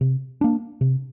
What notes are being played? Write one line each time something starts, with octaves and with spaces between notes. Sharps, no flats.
C3
A#3 D4
C3